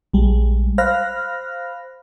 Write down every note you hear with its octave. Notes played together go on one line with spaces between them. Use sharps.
A#1 G3 G#3
C5 F5 B5 F6 F#6 A#6